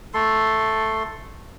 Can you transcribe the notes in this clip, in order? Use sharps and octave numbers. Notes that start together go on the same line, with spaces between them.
A3 A4 C6